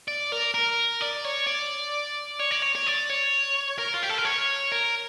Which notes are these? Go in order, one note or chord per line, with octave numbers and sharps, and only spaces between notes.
D5
A#4
A#4
D5
C#5
D5
C#5
D5
C#5
C#5
D5
C#5
A#4
F4
G4
A4
A#4
C#5
A#4